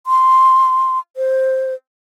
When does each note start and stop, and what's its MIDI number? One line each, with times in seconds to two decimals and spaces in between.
0.07 0.99 84
1.17 1.74 72